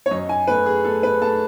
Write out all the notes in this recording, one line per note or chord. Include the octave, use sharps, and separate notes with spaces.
C#5
F#2 D#5
G#5
A3 B4
G#4
A3 A4
B4
A3 A5